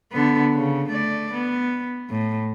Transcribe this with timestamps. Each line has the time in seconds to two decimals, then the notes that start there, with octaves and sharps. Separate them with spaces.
0.12 D3 B3
0.54 C#3
0.89 A3 D5
1.33 B3
2.10 A2